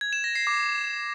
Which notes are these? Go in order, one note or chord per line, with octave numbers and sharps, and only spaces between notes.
G#6
E7
A#6
C7
D6